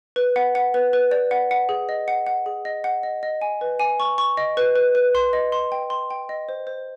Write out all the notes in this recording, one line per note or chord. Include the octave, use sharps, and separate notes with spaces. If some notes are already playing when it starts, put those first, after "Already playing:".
B4
F#5
F#5
B4
B4
D5
F#5
F#5
G#4
D#5
F#5
F#5
G#4
D#5
F#5
D#5
D#5
G#5
B4
G#5
C#6
C#6
D#5
B4
B4
B4
C6
D#5
C6
G5
C6
G5
D#5
C5
C5